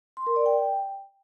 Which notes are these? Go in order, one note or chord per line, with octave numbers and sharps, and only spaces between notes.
C6
A#4
D5
G5